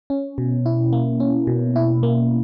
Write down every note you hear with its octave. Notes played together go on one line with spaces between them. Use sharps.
C#4
B2
E4
A#3
C#4
B2
E4
A#3